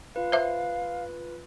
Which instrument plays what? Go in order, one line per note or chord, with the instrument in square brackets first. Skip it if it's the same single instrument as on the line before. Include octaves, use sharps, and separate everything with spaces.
[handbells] F4 B4 [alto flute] F5
[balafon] C5 E5